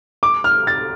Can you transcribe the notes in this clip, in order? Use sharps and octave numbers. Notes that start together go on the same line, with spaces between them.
D6
F6
A6